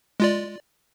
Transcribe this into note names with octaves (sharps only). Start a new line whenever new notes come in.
G#3 F4 D5